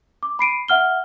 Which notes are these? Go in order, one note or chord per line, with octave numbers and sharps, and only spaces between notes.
D6
B5 C7 D7 D#7
E5 F#5 F6 G7